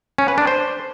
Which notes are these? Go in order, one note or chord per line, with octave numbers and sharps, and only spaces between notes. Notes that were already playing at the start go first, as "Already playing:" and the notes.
C#4
B4
D4
C5